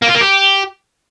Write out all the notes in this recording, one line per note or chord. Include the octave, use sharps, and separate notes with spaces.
A#3
F4
A#3
G4